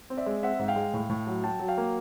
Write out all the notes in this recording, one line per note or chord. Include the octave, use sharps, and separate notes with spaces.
C4
D5 E5
G#3
C4 E5 F#5
G#2
F5 G5
G#3
A2
A2
F#3
F#3 G5 A5
F#3
F5 G5
A#3